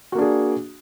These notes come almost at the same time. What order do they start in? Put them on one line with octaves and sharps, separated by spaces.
F#4 A#3 D4 G#4